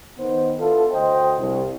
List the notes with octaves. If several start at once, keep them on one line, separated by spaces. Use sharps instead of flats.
D#3 B3 C5
B3 D4 E4 F4 A4
D2 C5 D#5 G5
C2